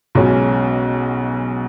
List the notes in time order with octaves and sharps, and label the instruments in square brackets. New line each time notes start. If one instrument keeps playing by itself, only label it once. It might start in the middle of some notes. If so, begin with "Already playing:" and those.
[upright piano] B1 B2 G#3 C#4